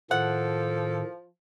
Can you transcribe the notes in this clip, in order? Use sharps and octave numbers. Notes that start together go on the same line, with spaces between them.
A2 D#3 F3 A4 F#5